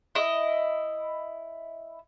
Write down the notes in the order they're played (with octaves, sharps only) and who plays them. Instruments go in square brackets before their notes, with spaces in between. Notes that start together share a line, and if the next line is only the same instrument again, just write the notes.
[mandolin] E4 D#5